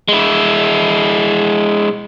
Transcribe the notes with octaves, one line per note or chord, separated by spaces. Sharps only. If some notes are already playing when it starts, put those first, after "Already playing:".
G#3 E4